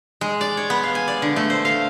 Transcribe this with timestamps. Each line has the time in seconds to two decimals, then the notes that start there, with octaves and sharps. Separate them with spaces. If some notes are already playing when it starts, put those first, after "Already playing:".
0.21 G#3
0.41 D5
0.57 C#5
0.70 B3
0.83 F5
0.95 G#5
1.08 D5
1.22 D3
1.36 A3
1.50 C5
1.65 F5